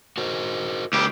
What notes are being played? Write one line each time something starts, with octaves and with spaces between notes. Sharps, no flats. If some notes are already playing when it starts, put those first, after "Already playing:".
F#4 A#4 C5
C#2 G4